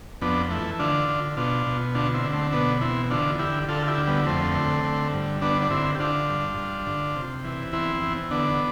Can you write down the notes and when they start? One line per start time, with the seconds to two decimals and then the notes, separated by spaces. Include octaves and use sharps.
0.21 F2 B3 D4
0.50 E3 A3
0.79 D3 D4 F4
1.08 D3
1.37 B2 D4 F4
1.66 B2
1.95 D2 D4 F4
2.14 C4 E4
2.24 D3
2.33 A3 C4
2.52 B2 B3 D4
2.81 E2 C4 E4
3.10 D3 D4 F4
3.39 D3 E4 G4
3.68 D3 F4 A4
3.82 F4
3.87 E4 G4
3.97 D2
4.07 G3 B3
4.26 F2 A3 C4
4.55 D3
4.84 D3
5.13 G2
5.42 D3 B3 D4
5.62 D4
5.71 D3 C4 E4
5.95 G4
5.99 D3 D4 F4
6.29 G2
6.58 G2
6.86 D3
7.16 C3
7.44 E3
7.73 E2 C4 E4
8.02 E2
8.31 D3 B3 D4